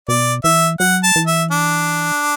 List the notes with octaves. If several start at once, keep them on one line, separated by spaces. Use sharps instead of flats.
B2 D5
E3 E5
F#3 F#5
A5
E3
E5
D4